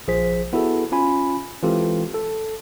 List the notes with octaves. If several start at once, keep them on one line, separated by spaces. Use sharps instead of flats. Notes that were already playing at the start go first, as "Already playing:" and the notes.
A#1 F3 G#4 C5 B6
B3 E4 F#4 G#4 A4
C#4 F4 G#5 B5
E3 G#3 C4 F4 G4 A4
A4